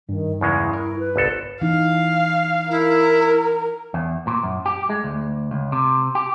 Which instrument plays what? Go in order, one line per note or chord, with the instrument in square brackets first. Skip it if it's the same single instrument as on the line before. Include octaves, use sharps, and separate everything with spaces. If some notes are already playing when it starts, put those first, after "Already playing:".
[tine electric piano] G2 [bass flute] D#3
[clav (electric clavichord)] E2 C#3 G#3 [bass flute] E4
[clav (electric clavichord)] A#4
[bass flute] B4
[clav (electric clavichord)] G1 C2 A4
[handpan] E3 D#4 [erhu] F5
[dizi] E4 [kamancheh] A#4
[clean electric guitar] E2
A#2
F#2
G4
G#3
D2
C#2
C3
G4